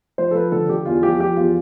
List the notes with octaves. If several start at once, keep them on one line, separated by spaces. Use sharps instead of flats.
F3 C5
A4
F3 B4
D3 A4
D3 G4
E2 F4
F3 G4
F3 G4
E2 F4